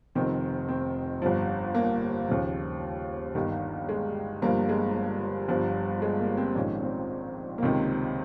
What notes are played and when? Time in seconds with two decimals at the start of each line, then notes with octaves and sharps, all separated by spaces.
0.15 F1 F2 D#3 C4
0.69 C4
1.22 G1 G2 F3
1.75 A#3
2.29 D#2 C#3 F3
3.35 G1 G2 D#3 G3
3.89 G#3
4.42 G1 G2 F3 A#3
4.69 G#3
5.48 G1 G2 F3
6.02 G#3
6.19 A#3
6.37 C4
6.55 A#1 G#2 D#3 C#4
6.82 C4
7.58 A#3
7.62 C#2 C3 D#3 C4